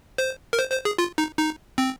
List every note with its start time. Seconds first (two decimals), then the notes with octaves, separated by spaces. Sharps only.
0.18 C5
0.53 A#4
0.59 C5
0.72 C5
0.85 G#4
0.98 F4
1.18 D#4
1.37 D#4
1.78 C4